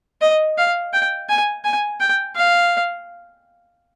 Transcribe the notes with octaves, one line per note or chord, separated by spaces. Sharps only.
D#5
F5
G5
G#5
G#5
G5
F5